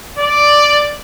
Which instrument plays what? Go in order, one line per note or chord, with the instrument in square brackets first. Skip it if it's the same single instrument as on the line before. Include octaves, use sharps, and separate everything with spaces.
[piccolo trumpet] D5